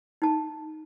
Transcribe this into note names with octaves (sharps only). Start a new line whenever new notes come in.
D#4 A5